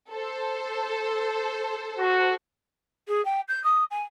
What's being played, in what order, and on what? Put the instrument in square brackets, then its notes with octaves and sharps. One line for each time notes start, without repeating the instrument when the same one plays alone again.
[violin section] A4 C5
[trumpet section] F#4
[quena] G#4
G5
G6
D#6
G#5